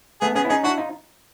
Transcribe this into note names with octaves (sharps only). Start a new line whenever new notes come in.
A3 B3 G#4
B3 C#4 G#4
E4
C#4 D#4 G#4
D4 E4 F#4
D#4 F4